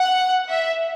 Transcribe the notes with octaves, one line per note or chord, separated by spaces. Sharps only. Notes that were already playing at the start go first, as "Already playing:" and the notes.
Already playing: F#5
E5